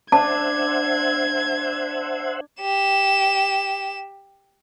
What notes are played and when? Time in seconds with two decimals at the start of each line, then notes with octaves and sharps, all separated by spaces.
0.12 D4 C5 E5 F#5 A5 G#6
2.61 G4 E7